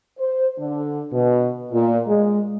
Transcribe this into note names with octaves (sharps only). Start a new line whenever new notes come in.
C5
D3
B2
A#2
G#3